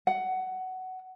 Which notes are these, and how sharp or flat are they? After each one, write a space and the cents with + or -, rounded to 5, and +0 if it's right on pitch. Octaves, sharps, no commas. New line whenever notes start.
F#5 +15